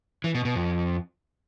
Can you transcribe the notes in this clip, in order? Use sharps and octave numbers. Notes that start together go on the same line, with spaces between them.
E3
B2
B2
F2